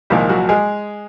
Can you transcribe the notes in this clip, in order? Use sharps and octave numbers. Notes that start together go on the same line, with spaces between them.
C2 A#2 D#3 F3 G#3 D#4
F#3 F#4
G#3 G#4